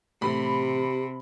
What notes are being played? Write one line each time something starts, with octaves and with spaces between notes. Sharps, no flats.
A2 C3 E3 A3 G4 B5